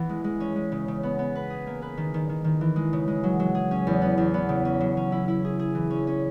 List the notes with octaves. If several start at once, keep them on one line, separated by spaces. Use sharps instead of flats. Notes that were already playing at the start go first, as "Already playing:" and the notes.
Already playing: E3 B3
G#3
G#3
C#4
G#3
C#3
C#3
B3
B3
B4
G#4
A#3
B4
D#3
D#3
D#3
D#3
E3
G#3
C#3
G#3
F#3
F#3
G#4
C#4
E2
B3
E2
B3
C#3
C#4
F#3
C#4
E4
E4
G#4
G#4
E3
C#4
C#4